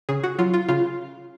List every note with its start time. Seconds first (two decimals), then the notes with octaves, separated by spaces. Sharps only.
0.09 C#3 G#4
0.24 F#4
0.38 F#3 F4
0.54 F4
0.69 C#3 F4